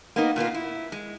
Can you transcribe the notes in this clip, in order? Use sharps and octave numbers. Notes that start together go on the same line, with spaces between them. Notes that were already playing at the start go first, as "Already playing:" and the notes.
A#3 B3 D#4
A#2 A#3 B3 F4
E4
G#3